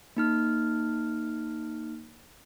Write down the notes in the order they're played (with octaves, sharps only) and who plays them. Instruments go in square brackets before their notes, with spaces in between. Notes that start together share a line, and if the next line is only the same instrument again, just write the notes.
[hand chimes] A#3 D#4 F6